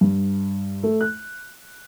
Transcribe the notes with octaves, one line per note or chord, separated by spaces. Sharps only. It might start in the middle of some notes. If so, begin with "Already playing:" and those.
G2
A3
F#6